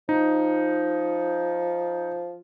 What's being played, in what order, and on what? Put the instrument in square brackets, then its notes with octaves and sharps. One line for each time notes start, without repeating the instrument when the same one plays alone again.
[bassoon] F3 [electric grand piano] D#4